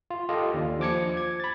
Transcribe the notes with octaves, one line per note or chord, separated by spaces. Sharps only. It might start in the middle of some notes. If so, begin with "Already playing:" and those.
F4
F4 G4 A4 D#5 F5
D#2 D4
F3 D6 G#6 C#7
G#6
B5 A6